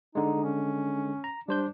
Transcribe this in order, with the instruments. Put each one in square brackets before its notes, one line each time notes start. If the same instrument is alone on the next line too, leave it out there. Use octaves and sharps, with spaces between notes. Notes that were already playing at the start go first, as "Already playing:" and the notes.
[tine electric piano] D3 G#3 [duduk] D#4
[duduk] C#4
[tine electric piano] A#5
[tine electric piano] G3 C5 G6 [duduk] D4